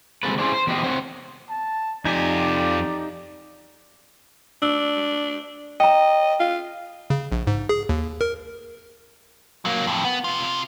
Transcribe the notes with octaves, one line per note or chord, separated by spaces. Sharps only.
D#3 G3 G#3 C4 A4 B4
C#4 E4 G#4 C5 D5
C5
E2 B3 G4 C5 D#5
C4 C5 C#5 F#5
A5
F2 D#4 G4 D5 G#5
D4 E6
D#5 G5 A#5
F4
C#3
A#1
G#2
G#4
D#2
A#4
F#3 A#3
F2 A2
B3
C3 F4